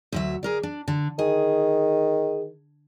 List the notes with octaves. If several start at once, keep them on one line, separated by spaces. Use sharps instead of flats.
D2 F#3 E5
G#4 A#4 D5
D4
D3
D#3 G#4